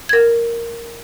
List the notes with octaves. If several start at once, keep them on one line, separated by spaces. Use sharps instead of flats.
A#4 G#6